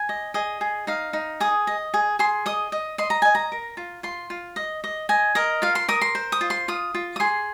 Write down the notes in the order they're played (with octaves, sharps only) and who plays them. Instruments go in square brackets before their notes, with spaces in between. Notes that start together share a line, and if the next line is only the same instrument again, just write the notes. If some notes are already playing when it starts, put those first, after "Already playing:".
Already playing: [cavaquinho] G#5
D#5
G#4 D#5
G#4
D#4 F5
D#4
G#4 D#6
D#5
G#4
G#4 C6
D#5 D#6
D#5
D#5 C6
A#5
D#5 G#5
A#5
A#4
F4
F4 C6
F4
D#5
D#5
D#5 G#5
A#4 D#5
F4 F5
C6
A#4 D#6
C6
C5
D#6
F4
C6
F4 D#6
F4
D#6
G#4 C6